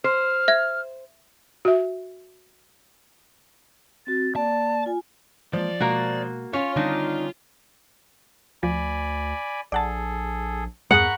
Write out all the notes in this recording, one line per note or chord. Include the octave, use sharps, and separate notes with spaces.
C5 F6
E5 G#6
F#4 E5
C4 F#4 A6
A#3 D5 A5
F4 G#5
E3 F3 G#3 A#3 D5
B2 G#3 A#3 F#4
C#4 F4 C#5 F5
D3 D#3 G3 C4 D4 D#4
D2 F3 D5 G#5 B5
A#1 G#4 A4 D5 F#5 A5
E2 G2 G#4 F#5 A#5 B5 C#6 D#6